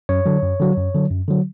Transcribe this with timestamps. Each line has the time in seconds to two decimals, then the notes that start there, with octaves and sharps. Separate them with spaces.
0.09 F#2 C#5
0.26 D3 F#3
0.42 F#2
0.60 D3 F#3
0.78 F#2
0.95 D3 F#3
1.11 F#2
1.28 D3 F#3